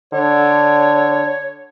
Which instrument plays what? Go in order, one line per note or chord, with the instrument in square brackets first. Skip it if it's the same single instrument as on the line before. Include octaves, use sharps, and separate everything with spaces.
[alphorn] D3 [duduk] C#5